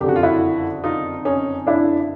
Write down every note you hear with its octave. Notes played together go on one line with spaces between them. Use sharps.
F#1 F2 D3 G4
F#4
F4
E4 F#4
D#4 F4
C#4 D#4
D4 E4